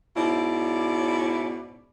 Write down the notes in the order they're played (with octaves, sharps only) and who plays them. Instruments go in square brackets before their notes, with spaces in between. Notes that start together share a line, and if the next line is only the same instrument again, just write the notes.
[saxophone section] G#2 B2 C#4 E4 D5